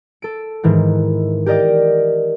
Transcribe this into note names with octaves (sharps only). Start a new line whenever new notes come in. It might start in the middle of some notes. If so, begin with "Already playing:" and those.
A4 D7
G#2 D#3 E3
G4 A#4 D5 D#5 G5